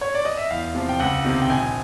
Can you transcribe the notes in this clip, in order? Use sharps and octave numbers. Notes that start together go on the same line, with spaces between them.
C#5
D5
D#5
E5
E2 F5
C3 F3
G5
C#2 F#5
C3 D#3
G5
A#1 G#5